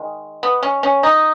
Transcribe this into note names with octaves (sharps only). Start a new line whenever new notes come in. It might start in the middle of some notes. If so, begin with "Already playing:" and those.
Already playing: D#3 G#3
B3
C#4
C#4
D#4